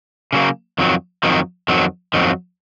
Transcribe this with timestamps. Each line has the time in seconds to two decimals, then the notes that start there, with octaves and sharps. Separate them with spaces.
0.33 C#3 F#3 A#3
0.78 F2 D#3 F#3
1.23 F2 D#3 F#3
1.68 F2 D#3 F#3
2.14 F2 D#3 F#3